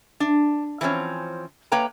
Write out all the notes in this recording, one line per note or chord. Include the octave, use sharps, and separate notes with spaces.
D4
E3 F3 C4 C#4 C#5
A#3 B4 C#5 G5 A#5